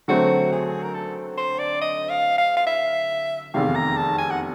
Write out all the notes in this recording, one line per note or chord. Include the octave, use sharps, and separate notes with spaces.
D3 F#3 A3 C4 F#4
G#4
A#4
A4
C5
D5
D#5
F5
F5
F5
E5
F1 E2 C3 D#3 F5
A#5
A5
G#5
F#5